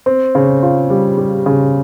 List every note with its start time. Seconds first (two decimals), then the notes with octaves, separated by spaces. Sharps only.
0.06 C4
0.35 C#3
0.63 F4
0.90 G3
1.17 G3
1.46 C#3